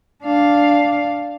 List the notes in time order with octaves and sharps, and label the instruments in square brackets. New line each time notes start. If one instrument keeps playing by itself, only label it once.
[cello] D4 F5